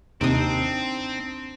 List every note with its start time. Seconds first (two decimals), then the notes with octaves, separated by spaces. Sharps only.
0.21 D#2 C3 C4 D4 D#4 D#6